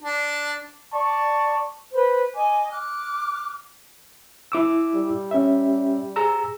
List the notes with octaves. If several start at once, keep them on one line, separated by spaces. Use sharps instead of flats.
D4
D5 A5 C#6
B4 C5 B5
D#5 G#5 D6
D6 F6 F#6
E4 D6 E6
G3
C#4 E5
G#4 A#5 E6